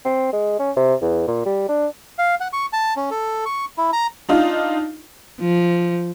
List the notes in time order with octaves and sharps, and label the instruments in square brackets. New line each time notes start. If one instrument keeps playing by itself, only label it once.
[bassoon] C4
G#3
C#4
C3
E2
A#2
G3
D4
[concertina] F5
F#5
C#6
A5
C#4
A4
C#6
E4
A#5
[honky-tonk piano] D4 D#4 F4
[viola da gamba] F3